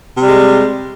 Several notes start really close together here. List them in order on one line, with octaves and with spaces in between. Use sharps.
C3 G3 G#3